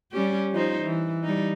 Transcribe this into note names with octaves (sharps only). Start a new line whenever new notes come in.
G3 C#4 G4
F3 D#4 C5
E3
G3 D#4